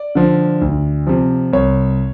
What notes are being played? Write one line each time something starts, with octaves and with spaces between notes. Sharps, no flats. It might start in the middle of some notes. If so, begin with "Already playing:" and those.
Already playing: D5
D3 F3
D2
C3 F3
C2 C#5